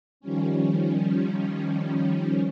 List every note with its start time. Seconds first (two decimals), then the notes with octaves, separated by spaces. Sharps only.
0.20 D#3 F3 G3 C#4